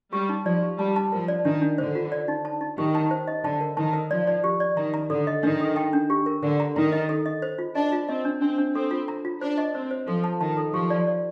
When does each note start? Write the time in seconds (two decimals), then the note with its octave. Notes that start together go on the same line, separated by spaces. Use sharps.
0.13 G3 G4
0.29 D#4
0.46 F3 D5
0.62 G4
0.79 G3 A5
0.96 A5
1.12 F3 A#4
1.28 D5
1.45 D#3 D4
1.62 D4
1.78 D3 C5
1.95 F4
2.12 D5
2.28 D#4
2.45 A5
2.61 D#4
2.78 D#3 G4
2.95 A5
3.11 C5
3.28 D#5
3.44 D3 A5
3.61 A#4
3.77 D#3 A5
3.93 A#4
4.10 F3 D5
4.27 D5
4.44 G4
4.60 D5
4.77 D#3 A#5
4.94 A#5
5.10 D3 A4
5.27 D#5
5.43 D#3 D4
5.60 A4
5.76 G5
5.93 D4
6.10 G4
6.26 A#4
6.43 D3 A#4
6.60 A#5
6.76 D#3 A#5
6.92 D#5
7.09 A4
7.26 D#5
7.42 C5
7.58 F4
7.75 D4 D#5
7.92 F4
8.08 C4 D#5
8.25 D4
8.42 C4 D4
8.58 D4
8.75 C4 A4
8.91 F4
9.08 A#5
9.25 F4
9.41 D4 C5
9.58 D#5
9.74 C4 C5
9.91 C5
10.07 F3 A4
10.24 A5
10.41 D#3 A5
10.57 A4
10.74 F3 G4
10.90 D5
11.07 D5